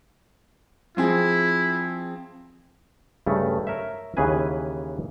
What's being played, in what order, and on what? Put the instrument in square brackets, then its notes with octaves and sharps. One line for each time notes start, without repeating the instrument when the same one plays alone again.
[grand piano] F3 C4 G#4 [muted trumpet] E4
[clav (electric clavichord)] G2 C#3 A3
A#4 C#5 E5
D#2 C#3 E3 G#4 B4 G#5